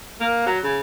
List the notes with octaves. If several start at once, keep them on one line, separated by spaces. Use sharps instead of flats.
A#3
F#3
C#3